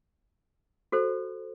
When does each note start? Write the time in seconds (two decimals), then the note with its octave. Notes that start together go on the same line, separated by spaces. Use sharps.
0.92 F#4 A4 C5